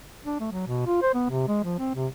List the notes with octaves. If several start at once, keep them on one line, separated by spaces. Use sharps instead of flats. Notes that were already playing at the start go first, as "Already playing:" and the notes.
D4
A3
F#3
B2
F4
C5
B3
C3
G#3
F3
C4
C3